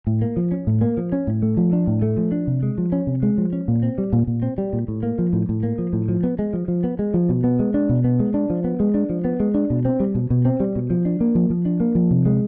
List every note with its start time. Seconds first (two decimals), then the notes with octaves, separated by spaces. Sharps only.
0.07 A2
0.22 A#3
0.37 F3
0.52 C#4
0.67 A2
0.81 A#3
0.97 F3
1.12 C#4
1.27 A2
1.42 A3
1.57 F3
1.73 D4
1.87 A2
2.02 A3
2.17 F3
2.32 D4
2.47 C3
2.63 G#3
2.78 F3
2.92 C#4
3.07 C3
3.23 G#3
3.38 F3
3.53 C#4
3.68 A#2
3.83 C4
3.98 G3
4.13 A#2
4.27 A#2
4.42 C4
4.58 G3
4.73 A#2
4.88 A2
5.03 A#3
5.19 F3
5.33 A2
5.49 A2
5.63 A#3
5.78 F3
5.93 A2
6.08 F3
6.23 B3
6.39 G#3
6.53 F3
6.68 F3
6.84 B3
6.99 G#3
7.14 F3
7.29 B2
7.44 B3
7.59 G#3
7.74 D4
7.89 B2
8.04 B3
8.20 G#3
8.34 D4
8.50 F3
8.64 B3
8.80 G#3
8.94 D4
9.10 F3
9.25 B3
9.40 G#3
9.54 D4
9.70 B2
9.85 C4
10.00 G3
10.15 B2
10.30 B2
10.45 C4
10.60 G3
10.76 B2
10.90 F3
11.05 D4
11.21 A#3
11.35 F3
11.50 F3
11.65 D4
11.80 A#3
11.95 F3
12.11 C3
12.26 G#3